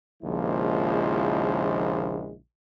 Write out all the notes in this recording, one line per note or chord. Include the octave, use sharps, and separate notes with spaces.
A#1 D#2 C#3 F3 G#3 E4